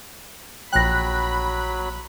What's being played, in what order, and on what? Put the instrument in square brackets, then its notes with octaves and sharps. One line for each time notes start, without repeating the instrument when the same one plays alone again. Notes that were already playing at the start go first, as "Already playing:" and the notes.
[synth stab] A#1 F#6 [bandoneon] F#3 [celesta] G5 A#6 [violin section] B5